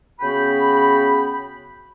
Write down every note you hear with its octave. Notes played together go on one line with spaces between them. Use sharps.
C#3 B3 F#4 G5 B5